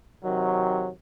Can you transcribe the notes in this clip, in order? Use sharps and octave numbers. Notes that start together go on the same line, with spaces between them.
C3 D#3 F#3